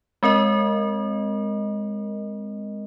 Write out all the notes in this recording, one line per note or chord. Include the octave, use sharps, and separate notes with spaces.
G#3 C4 A#4 D#5